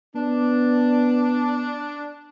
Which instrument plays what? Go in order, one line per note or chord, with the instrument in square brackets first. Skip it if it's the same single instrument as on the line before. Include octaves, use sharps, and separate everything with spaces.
[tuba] B3 [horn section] D4